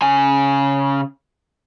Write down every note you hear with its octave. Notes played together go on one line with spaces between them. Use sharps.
C#3 G#5